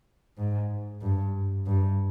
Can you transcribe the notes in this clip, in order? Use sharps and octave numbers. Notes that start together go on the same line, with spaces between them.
G#2
G2
G2